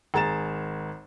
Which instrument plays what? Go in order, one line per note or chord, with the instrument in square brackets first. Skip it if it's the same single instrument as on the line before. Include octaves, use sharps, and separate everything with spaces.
[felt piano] G#1 G#4 A#5 A6 E7